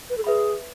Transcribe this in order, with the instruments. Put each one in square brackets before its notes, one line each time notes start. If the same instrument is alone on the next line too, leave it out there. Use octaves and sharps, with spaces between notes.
[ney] B4
A4
[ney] G#4 [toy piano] B4 E5 B5